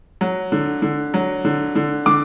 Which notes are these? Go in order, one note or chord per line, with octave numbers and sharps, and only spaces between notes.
F#3
D3
D3
F#3
D3
D3
D3 D6